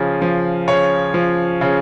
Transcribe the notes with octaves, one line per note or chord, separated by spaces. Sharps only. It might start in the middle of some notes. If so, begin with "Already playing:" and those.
Already playing: C#3 F3
F3
C#3 C#5
F3
C#3